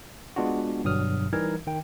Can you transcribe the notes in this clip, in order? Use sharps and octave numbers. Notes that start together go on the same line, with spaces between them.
G#3 B3 D4 F4 F#4
G1 G2 B2 F#3 D#6 F6
E3 G3 D#4 A#4 G#6
D#3 G5